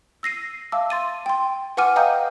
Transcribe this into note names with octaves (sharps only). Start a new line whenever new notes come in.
E6 A#6 C7 D#7
E5 F5 A5 D6 E6
C6 A6 D#7
G5 C6
B4 F#5 G#5 D6 F6 D#7
D#5 F5 G5 A#5 D#6 G6